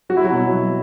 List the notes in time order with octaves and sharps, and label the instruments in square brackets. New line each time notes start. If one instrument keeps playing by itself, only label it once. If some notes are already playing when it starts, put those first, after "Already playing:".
[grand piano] F#3 F#4
E4
F#3 F#4
B2
F#3